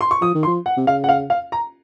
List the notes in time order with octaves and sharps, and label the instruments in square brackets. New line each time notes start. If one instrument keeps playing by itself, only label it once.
[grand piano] C6
C#6
[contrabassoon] F3 [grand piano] D#6
[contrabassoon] D#3
[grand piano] C6
[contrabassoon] F3
[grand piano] F#5
[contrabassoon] C3
[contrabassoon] C#3 [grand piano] F5
[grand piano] F#5
F5
F5
A#5